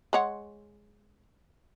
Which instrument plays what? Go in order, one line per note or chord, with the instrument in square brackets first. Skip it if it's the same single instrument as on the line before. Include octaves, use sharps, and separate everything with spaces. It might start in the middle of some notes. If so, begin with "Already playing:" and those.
[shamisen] G#3 C#5 F#5